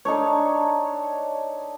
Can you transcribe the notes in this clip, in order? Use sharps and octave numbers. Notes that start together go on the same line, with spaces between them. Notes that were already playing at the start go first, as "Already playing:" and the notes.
D4 D#4 A4 C#5